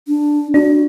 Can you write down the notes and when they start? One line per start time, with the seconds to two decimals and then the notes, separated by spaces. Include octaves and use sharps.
0.07 D4
0.54 D4 F#4